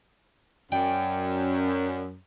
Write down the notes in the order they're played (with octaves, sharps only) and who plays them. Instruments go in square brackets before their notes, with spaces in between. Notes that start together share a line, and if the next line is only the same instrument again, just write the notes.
[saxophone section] F#2 [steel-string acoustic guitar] D5 G5 G#5